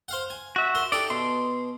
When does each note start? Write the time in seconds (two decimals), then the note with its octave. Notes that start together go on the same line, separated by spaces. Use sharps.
0.08 C5 F5 F#5
0.30 G#5
0.56 F#4 E5
0.75 A#4 C6
0.92 D#4 G4 A4 D5
1.10 B2 C6